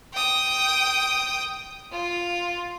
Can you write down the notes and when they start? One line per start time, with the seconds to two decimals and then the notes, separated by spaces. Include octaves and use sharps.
0.13 G5 D#6
1.91 F4